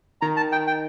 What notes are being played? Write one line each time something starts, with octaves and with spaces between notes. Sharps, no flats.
D#3 A#5
A5
D#3 G5
G5